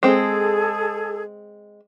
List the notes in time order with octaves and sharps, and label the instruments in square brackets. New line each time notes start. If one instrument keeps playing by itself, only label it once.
[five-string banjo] G#3 C4 [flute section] G#4 A4